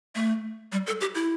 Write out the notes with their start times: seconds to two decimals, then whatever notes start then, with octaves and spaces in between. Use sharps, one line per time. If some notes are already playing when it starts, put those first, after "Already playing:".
0.15 A3
0.72 G3
0.86 A4
1.01 G4
1.15 E4